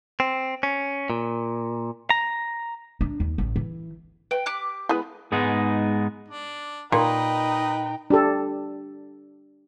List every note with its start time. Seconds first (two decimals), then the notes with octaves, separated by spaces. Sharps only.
0.20 C4
0.63 C#4
1.10 A#2
2.10 A#5
3.01 D4
3.20 D#2
3.38 A1
3.56 E3
4.31 B4 G5
4.46 G4 D6 F#6
4.89 G#3 B3 E4 B4
5.32 G#2 G#3 B3 D#4 G#4
6.28 D4
6.92 A#2 D#4 B4 D#5 G5
8.10 D4 G4 A4